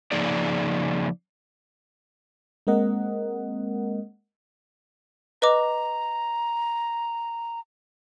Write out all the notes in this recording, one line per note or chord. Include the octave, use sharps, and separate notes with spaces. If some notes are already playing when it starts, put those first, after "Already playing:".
C#3 F3 A#3 D#4 G#4 D5
G#3 A#3 C4 A#4 D#5 F#5
B4 D#5 A#5 D6